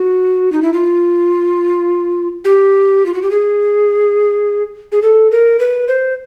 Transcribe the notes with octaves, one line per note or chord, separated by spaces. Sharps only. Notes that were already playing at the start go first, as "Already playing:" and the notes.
Already playing: F#4
D#4
E4
F4
G4
F4
F#4
G4
G#4
G#4
A4
A#4
B4
C5